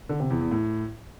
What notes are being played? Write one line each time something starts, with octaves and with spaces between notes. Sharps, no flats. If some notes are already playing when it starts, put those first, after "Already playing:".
D3
C3
E2
E2
A2